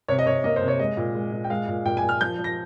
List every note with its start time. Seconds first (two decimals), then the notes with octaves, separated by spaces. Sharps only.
0.08 C3 C#5
0.19 D#5
0.26 C3 C#5
0.44 A#3 D#5
0.56 C5
0.62 C3
0.68 C#5
0.79 G#3 D#5
0.97 A#2
1.15 G#3
1.32 A#2
1.44 G5
1.50 G#3 F5
1.68 A#2
1.85 A#2 G5
1.97 G#5
2.03 A#2
2.09 F6
2.21 F3 G6
2.38 F3
2.44 A#6